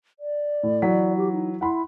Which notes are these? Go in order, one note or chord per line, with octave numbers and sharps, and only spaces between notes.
D5
A2
E3 F#3 B6
G4
D#4
E4 F#5 B5 C6